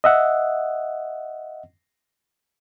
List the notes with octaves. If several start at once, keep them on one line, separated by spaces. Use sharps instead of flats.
D#5 E5 F#5